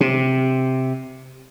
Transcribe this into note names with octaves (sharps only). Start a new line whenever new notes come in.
C3